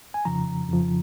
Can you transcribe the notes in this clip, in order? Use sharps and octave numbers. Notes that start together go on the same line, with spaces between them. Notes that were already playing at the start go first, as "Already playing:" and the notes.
G#5
F2 C#3 F3 A#5
F2 C#3 F3